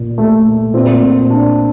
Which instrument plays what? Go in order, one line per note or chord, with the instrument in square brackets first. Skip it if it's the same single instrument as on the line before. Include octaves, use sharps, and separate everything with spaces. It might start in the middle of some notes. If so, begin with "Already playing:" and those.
Already playing: [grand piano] A#2
A3
A#2 C4
D4